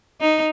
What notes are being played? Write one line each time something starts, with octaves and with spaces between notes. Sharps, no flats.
D#4